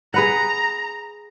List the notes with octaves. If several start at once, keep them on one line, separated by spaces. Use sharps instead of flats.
G#4 B4 F#5 A#5